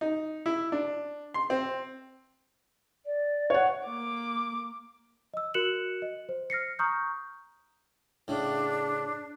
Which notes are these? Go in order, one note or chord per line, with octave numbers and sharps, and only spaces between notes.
D#4
E4
D4
C6
C4
D5
C#5 F#5
A#3 D6
D#5 E6
F#4 A#4 F#6 C#7 E7 F#7
D#5
C5
F6 A#6 C7 C#7
A#5 C#6 D#6 F6 G6
A2 C#3 D4